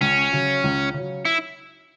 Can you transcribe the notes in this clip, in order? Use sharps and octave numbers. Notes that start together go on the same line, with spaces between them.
C#2 C#4
C#3 F#3
C#2
C#3 F#3
E4